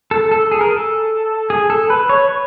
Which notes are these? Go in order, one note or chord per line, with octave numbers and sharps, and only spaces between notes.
A4
A4
G#4
A#4
A4
G#4
A4
B4
C#5
C#5